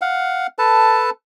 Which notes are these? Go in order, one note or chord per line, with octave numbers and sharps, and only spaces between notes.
F5 F#5
A4 B4 A5